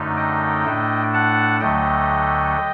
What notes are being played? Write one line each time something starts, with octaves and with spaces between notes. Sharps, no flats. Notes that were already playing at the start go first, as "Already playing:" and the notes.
Already playing: F#2 D3 A3 D#4
D#5 G5
A2 A3 D4
F#5 A5
D2 D3 F#3 A3 D#5 G5